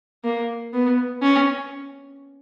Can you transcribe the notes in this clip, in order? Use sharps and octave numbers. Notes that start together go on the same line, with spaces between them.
A#3
B3
C#4